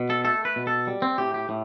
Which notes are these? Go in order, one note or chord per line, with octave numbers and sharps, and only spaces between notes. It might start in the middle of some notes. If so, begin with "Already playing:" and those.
Already playing: B2
A4
A3 A4
B4
B2
A4
G3
C4
A2 G4
G4
A2